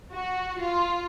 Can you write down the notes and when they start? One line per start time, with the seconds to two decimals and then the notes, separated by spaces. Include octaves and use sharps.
0.14 F#4
0.61 F4